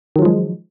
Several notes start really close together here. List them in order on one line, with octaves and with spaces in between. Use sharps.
D#3 F#3 F3 G#3